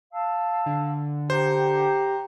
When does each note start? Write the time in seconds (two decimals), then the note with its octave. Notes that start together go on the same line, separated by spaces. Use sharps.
0.12 F5 A5 E6
0.66 D3
1.30 G4 C5 F#5 A#5